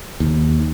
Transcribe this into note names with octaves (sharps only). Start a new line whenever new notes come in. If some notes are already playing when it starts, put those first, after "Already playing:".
D#2